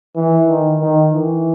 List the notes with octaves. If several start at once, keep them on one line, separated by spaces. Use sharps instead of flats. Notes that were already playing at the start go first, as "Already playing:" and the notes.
E3
D#3
D#3
E3